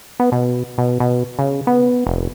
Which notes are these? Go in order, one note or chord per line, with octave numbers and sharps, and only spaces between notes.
B3
B2
B2
B2
C#3
B3
F1